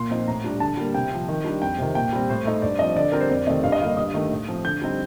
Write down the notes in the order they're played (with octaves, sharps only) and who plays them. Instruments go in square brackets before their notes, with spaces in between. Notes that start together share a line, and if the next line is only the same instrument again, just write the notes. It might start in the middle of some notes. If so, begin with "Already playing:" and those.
Already playing: [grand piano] A#2 C6
F3 C4 D#4
A2 A#5
G3 D4
D3 A5
G3 A#3
C3 G5
F3 C4
D#3
G3 D4
F2 G5
C3 D#3
A#2 G5
G3 C4
A2 C5
A3 D#4
G2 D5
F3 C4 D#5
D3 D5
G3 C4 A#4
C5
F2 D5
C3 D#3 A3 C4 D#5
G2 F5
D#5
D3 G3 A#3 F5
G2 D#6
D#3 A3 D#4
A2
F3 C4
D3 G6
G3 C4 D#4